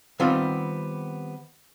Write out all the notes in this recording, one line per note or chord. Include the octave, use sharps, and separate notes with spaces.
D#3 G3 B3 C4 F4